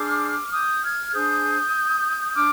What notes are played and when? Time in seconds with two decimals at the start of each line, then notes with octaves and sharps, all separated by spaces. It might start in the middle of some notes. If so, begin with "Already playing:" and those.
Already playing: D4 G#4 C5 D6 F6
0.52 D#6 G6
0.83 F6 G#6
1.13 D4 G#4 C5 D#6 G6
2.35 D4 D6 F6